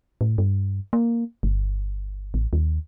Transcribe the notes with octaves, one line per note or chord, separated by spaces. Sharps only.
A2
G2
A#3
G1
A1
D#2